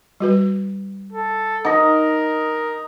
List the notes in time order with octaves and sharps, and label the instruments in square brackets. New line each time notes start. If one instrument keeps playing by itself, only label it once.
[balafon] G3 F#4 B4
[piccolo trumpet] A4
[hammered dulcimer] D#4 D#5 [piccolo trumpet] A#4 [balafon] F#5